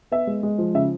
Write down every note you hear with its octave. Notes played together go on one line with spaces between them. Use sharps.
B3 E5
G#3
G#3
F3
C#3 E5